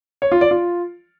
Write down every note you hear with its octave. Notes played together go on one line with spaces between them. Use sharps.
C#5
F4
D5
F4